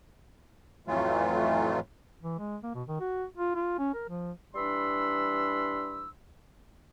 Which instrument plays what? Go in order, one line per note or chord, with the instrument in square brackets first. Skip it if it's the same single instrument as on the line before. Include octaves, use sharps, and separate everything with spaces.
[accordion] F2 A2 E3 F#3 A3 F4
[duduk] E3
G#3
A#3
B2
D#3
F#4
F4
F4
C#4
A#4
F3
[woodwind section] E3 G3 D4 B5 C6 E6